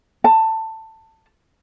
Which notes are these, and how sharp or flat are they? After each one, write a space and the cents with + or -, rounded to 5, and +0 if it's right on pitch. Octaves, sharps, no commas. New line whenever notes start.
A5 +15